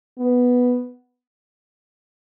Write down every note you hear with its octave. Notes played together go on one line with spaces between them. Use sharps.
B3